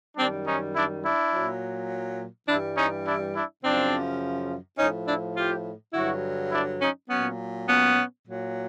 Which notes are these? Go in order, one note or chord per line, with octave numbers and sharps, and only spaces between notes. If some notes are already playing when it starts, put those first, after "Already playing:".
F#2 D#3 G3 C4 D4
C#4 D#4
D4 E4
D4 E4
A#2 F#3
G2 E3 G3 D4 E4
C#4 D#4
D4 E4
D4 E4
F#2 C#3 F3 C4 D4
A2 F3 C#4 D#4
D4 E4
F4 G4
G2 D3 F#3 E4 F#4
D4 E4
C#4 D#4
A#2 F#3 B3 C#4
B3 C#4
A#2 F#3